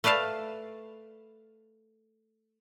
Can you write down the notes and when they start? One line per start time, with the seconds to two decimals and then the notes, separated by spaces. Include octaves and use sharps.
0.04 A3 B4 D5 F5 A5